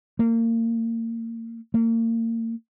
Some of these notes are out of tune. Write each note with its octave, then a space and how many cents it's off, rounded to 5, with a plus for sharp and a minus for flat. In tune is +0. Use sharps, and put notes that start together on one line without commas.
A#3 -30
A#3 -35